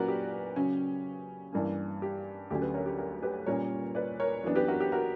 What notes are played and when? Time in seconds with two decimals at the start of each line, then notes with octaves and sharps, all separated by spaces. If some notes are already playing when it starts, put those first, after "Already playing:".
Already playing: A#2 F#3 C#4 F#4 A#4 B4 D5
0.08 G4
0.56 C#3 F#3 C#4
1.53 G2 E3 A#3 C#4
2.02 G4
2.51 D2 D3 F#3 C#4 G4
2.61 G4 B4
2.74 A#4 C#5
2.86 G4
2.98 F#4 A#4
3.23 G4 B4
3.46 A#2 G3 C#4 A#4 C#5
3.95 B4 D5
4.20 A#4 C#5
4.44 F#2 E3 B3 D4
4.55 G4 B4
4.68 F#4 A#4
4.80 G4
4.92 F#4 A#4